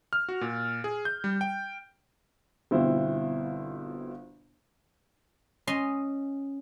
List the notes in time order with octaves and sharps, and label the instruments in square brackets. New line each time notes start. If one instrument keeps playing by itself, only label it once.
[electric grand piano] F6
F#4
A#2
G#4
G6
G3
G5
[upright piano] G1 B2 C4 E4 F4 C5
[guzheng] C#4 D#5 C6